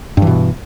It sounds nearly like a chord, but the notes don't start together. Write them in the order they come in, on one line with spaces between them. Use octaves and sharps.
G2 E3 B2